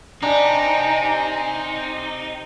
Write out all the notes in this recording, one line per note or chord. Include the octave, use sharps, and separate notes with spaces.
C4 D4 D#4 G4 G#5